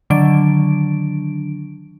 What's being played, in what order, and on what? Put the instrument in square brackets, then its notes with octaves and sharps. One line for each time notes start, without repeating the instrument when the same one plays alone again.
[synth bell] D3 D#3 F#3 D4 D7